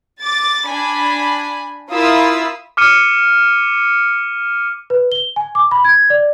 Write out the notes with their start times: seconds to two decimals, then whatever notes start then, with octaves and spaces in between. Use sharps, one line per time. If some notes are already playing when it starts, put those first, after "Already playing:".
0.20 D6 A6
0.66 D4 G#5 B5
1.91 E4 F4 A#4 D#6 E6
2.77 D6 F6 C#7 D#7
4.90 B4
5.12 G7
5.36 G#5
5.55 D6
5.71 B5
5.85 G#6
6.10 D5